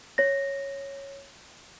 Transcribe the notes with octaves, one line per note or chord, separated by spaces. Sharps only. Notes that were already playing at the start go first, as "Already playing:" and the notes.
C#5 A#6